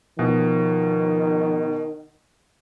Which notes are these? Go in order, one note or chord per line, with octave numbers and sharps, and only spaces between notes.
B2 D#3 F3